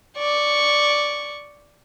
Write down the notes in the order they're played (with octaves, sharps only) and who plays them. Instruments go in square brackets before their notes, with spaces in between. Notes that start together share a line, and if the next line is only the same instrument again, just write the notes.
[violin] D5 C#6